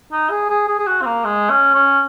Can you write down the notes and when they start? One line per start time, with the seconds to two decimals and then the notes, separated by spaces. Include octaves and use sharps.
0.12 D#4
0.30 G#4
0.50 G#4
0.68 G#4
0.79 G#4
0.87 F#4
1.02 C4
1.06 A#3
1.25 G#3
1.50 C#4
1.74 C#4